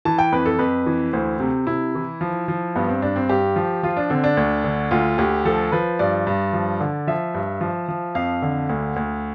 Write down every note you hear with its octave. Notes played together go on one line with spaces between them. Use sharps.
E3 A5
G5
F2 B4
A4
F2 B4
E3
D2 C5
C3
C3 E4
E3
F3
F3
G2 B3
C4
G2 D4
C4
G2 G4
F3
F3 F4
D4
D3 C4
D4
D2
D3
D2 F4
D2 G4
F3 A4
F3 B4
G2 D5
G2
F3
D3
F3 E5
G2
F3
F3
F2 F5
D3
D2
D2